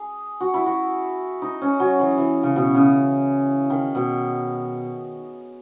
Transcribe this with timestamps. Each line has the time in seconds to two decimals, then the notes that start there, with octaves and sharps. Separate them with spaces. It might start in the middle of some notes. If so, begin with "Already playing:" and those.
Already playing: G#4
0.40 F#4
0.54 E4
0.66 F#4
1.42 D#4
1.61 C#4
1.80 F#3
1.99 E3
2.18 E3
2.43 C#3
2.56 B2
2.75 C#3
3.70 D#3
3.95 B2